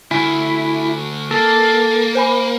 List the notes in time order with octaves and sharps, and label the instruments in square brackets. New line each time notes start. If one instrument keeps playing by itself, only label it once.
[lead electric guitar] D2 [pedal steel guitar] E4 [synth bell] G#5
[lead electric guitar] A#3 [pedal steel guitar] A4
[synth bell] C5 G#5 B5